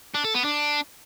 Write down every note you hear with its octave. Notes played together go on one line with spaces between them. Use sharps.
D4
A4
B3
D4